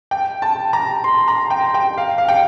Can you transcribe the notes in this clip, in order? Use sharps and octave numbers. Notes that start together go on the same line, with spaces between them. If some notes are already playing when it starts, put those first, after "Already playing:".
G5
A5
A#5
C6
A#5
G5
G5
F5
F5
G5